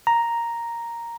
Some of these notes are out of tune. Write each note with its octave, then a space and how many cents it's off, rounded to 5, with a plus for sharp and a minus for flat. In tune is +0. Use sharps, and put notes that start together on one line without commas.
A#5 +0